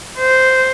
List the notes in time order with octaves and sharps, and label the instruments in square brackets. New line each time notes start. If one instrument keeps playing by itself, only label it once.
[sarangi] C5